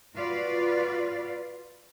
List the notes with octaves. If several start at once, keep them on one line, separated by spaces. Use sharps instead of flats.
F4 F#4 B4 D5 F5